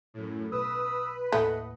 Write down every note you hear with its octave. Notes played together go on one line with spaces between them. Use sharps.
F#2 A2
B1 B4 D#6 E6
D#2 A2 A3 A#3 D#5 F#5